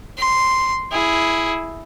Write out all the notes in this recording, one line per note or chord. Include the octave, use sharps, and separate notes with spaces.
C6
E4 G#4